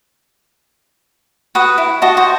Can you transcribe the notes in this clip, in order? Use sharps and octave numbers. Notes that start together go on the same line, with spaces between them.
F#4 B4 D#6
E4
F#4 D#5 A5
F#4 C5